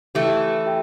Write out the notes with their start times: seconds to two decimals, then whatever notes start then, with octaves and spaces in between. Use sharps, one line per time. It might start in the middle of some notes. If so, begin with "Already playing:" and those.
0.15 E3 A3 G4 E5 G5
0.66 G4 E5 G5